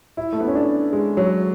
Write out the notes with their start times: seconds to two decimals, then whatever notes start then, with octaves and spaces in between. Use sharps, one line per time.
0.17 E4
0.33 A3
0.40 B3
0.48 C#4
0.55 D4
0.93 G#3
1.17 F#3